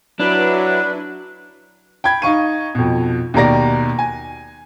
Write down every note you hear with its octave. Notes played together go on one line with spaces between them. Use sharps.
F#3 D4 E4 B4
G5 B5 G#6
D#4 F5 C#6 D#7
F2 B2
D#2 B2 G4 A#4 D5 A#6
G#5